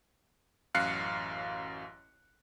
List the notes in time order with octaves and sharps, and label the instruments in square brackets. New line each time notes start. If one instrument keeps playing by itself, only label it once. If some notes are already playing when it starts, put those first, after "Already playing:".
[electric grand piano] A1 F#2 F5 F#6 C7 C#7